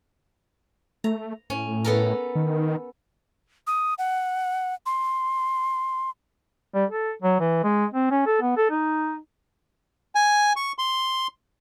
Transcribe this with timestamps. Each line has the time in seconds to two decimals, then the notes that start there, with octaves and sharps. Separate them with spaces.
1.04 A3 A#5
1.50 A2 C#4
1.85 B3 A4 A#4
2.36 D#3
3.67 D#6
3.98 F#5
4.86 C6
6.74 G3
6.90 A4
7.22 F#3
7.40 E3
7.64 G#3
7.94 C4
8.11 C#4
8.26 A4
8.42 B3
8.57 A4
8.70 D#4
10.15 G#5
10.56 C#6
10.78 C6